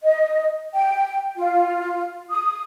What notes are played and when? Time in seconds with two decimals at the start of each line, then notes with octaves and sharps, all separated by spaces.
0.04 D#5
0.73 G5
1.37 F4
2.31 D#6